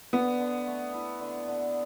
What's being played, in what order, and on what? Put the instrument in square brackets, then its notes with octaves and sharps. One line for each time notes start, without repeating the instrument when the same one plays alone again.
[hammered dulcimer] D3 [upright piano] B3
[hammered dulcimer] D3
A3
E4
D3
D3